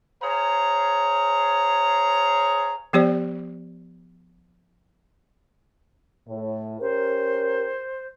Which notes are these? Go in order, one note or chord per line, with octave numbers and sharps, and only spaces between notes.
G#4 C5 C#5 F5 A#5
F3 B3 G4 C5 D5
A2
C#4 G4 A#4 C5